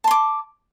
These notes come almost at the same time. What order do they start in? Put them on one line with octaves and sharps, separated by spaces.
A5 C6 D6